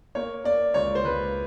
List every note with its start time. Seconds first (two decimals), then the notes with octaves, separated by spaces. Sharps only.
0.15 A#3 C#5
0.44 A#3 D5
0.74 C#2 C#5
0.95 C5
1.04 C#2 B4